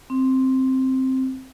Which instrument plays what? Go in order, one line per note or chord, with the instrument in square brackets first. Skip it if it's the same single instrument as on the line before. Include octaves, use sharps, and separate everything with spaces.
[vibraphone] C4